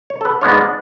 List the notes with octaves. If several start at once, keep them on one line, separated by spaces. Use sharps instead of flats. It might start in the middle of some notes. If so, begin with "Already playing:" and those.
C#5
A4
B4
G#2 G#3 B3 D4 F4 C#5
D5